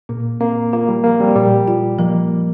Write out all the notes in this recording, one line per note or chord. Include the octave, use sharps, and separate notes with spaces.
A#2 A#3
A#3 C4
A#3 F4
G3
F3 A#3
G3 C4
A#2 G3
F4
F3 A#3